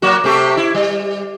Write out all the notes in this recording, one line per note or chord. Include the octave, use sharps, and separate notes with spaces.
F#3 A#3 F#4
C3 A3 G4
E4
G3